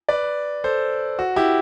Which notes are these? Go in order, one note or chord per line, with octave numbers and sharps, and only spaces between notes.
B4 D5
A4 C5
F#4
E4 G4